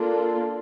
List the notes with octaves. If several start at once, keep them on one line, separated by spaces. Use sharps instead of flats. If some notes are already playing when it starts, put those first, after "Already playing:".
Already playing: A#3 D4 F4 A4